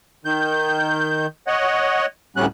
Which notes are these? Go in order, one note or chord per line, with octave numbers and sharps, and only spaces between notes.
D#3 G6
C#5 D#5 F#5
D2 A2 G3 B3 C#4 F#6